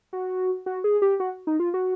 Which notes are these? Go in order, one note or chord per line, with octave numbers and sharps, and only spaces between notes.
F#4
F#4
G#4
G4
F#4
D#4
F4
F#4